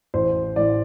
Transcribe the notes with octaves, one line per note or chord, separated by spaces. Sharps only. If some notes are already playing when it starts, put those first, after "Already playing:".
A1 C5
A2 D5